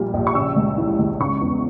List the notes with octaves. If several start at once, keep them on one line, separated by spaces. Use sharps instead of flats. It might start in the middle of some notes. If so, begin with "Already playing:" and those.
Already playing: A#1 A#2 G3
A#1
C#6
C#3 E6
C#2
E3
C#2
C#3 C#6
E2